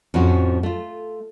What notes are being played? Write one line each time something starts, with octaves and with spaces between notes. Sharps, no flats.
F2 A2 F3 C4 C#4 F#4
A3 F4